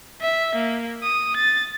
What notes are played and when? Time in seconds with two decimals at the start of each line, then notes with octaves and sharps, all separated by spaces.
0.22 E5
0.55 A#3
1.03 D#6
1.37 A6